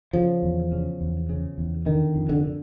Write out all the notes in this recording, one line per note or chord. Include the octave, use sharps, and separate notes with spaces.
C#3 F3
E2
C#3
E2
C#3
E2
D3 D#3
F2
D3
D3